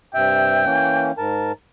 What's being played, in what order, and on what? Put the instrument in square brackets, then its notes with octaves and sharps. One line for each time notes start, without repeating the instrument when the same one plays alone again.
[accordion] G2 C3 E5 [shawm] G5
[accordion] E3 A#3 C#4
G#2 A#4 A5